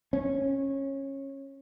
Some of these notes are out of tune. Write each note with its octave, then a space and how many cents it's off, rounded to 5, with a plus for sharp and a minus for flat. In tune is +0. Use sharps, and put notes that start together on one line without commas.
C#4 -20